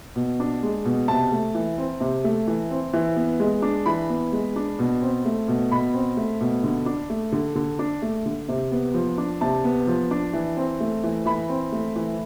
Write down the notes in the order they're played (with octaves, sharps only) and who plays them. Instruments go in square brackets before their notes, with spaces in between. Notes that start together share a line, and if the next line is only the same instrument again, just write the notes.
[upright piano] B2
D4
G#3
B2
C3 A5
A3
E3
C4
C3
A3
E3
C4
E3
B3
G#3
D4
E3 B5
B3
G#3
D4
B2
C4
A3
B2
B2 B5
C4
A3
B2
D3
D4
A3
D3
D3
D4
A3
D3
C3
B3
F3
D4
C3 A5
B3
F3
D4
E3
C4
A3
E3
E3 B5
C4
A3
E3